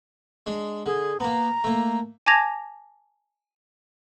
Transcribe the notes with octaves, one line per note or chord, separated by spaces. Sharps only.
G#3 D4
D3 G#4
A#3 B3 A#5
A3 A#3
G#5 A5 D6 G#6 A#6 F7